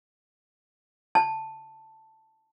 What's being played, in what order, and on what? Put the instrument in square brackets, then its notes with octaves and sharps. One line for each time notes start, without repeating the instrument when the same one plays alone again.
[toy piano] A5